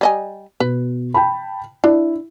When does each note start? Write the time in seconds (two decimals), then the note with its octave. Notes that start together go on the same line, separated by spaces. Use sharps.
0.01 G3 D#5 G#5
0.60 B2 B4
1.14 G5 A5 B5
1.84 D4 E4